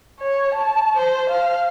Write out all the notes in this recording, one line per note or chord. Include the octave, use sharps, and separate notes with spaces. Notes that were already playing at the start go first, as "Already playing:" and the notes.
C#5
A5
C5
F5